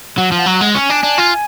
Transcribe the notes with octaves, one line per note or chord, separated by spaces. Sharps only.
F#3 F#5
F3
F#5
F#3
F#5
G#3
C#4 G#5
D4
D4
F4